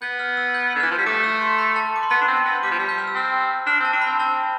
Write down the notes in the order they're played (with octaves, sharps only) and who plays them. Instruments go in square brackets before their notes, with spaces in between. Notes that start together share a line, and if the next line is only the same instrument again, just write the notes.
[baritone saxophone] B3 [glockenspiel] G6
[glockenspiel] F6
E6
G6
[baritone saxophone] D3
[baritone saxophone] E3 [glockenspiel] F6
[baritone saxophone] F3
G3
[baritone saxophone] A3 [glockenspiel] D6
[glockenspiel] E6
C6
B5
A5
D6
C6
[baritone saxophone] B3 [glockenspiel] B5
[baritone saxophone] D4
C4
[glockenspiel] C6
[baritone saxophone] B3
[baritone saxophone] G3 [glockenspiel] D6
[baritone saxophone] F3
G3
[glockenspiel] G6
F6
E6
[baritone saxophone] C4 [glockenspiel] F6
[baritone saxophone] D4 [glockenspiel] F6
[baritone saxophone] C4
[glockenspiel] A5
[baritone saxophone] D4
[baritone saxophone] C4 [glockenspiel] B5
[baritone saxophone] C4 [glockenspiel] A5